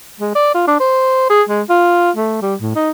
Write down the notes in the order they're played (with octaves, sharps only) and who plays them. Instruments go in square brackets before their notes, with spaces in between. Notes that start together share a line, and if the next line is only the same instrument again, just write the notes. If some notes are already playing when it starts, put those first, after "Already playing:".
[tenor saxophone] G#3
D5
F4
D4
C5
G#4
G#3
F4
A3
G3
A2
D#4